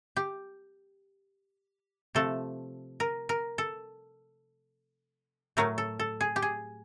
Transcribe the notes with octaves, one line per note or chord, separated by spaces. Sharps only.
G4
C3 F3 A3 A4
A#4
A#4
A4
A2 F#3 A3 A#4
A4
A4
G#4
G4
G#4